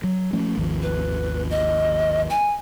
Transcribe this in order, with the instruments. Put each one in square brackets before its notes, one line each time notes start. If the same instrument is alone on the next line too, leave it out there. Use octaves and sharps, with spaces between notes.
[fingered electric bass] F#3
F3 A3 C#4
G#1 D#2 F3
[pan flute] B4
D#5
G#5